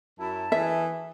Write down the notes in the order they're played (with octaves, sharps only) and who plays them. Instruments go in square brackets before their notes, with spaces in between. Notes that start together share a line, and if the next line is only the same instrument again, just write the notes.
[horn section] F#2 E4 [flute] A5
[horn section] E3 G#4 [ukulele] E5